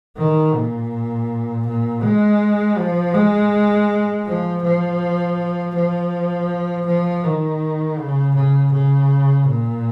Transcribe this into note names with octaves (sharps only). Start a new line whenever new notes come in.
D#3
A#2
A#2
G#3
F3
G#3
F3
F3
F3
F3
D#3
C#3
C#3
C#3
A#2